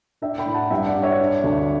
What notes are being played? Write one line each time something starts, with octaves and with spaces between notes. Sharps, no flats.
D4 E5 G5
G5 B5
A2
F#5 A5
G2 E5 G5
D5 F#5
G2
C#5 E5
D4
D2